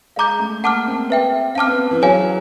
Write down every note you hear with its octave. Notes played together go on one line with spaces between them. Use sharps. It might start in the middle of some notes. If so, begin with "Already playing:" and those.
G#3 F5 A#5 D6 G6
A3
A#3 F#5 A5 D6 F6
C4
B4 E5 G5
C4 F5 A5 D6 F6
B3
E3
F#3 G#4 C#5 F5 G#5